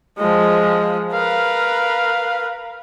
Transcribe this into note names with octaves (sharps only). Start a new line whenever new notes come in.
F3 G#3 D#5
A#4 B4 F5